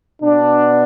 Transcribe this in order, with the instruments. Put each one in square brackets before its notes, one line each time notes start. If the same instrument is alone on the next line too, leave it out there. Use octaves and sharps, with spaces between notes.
[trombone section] B2 B3 D4